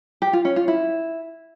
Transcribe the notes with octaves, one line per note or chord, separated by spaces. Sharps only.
G4
F4
C#4
F4
E4